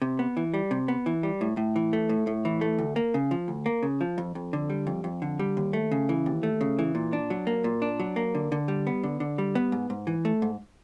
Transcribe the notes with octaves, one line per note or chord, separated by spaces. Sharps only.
C3
B3
E3
G3
C3
B3
E3
G3
A2
A2
E3
A3
A2
A2
E3
A3
D2
A#3
C#3
F3
D2
A#3
C#3
F3
F2
F2
D3
G3
F2
F2
D3
G3
D#2
A3
C#3
E3
D#2
A3
C#3
E3
A#2
D4
F#3
A#3
A#2
D4
F#3
A#3
D3
D3
G3
B3
D3
D3
G3
B3
G#2
G#2
E3
A3
G#2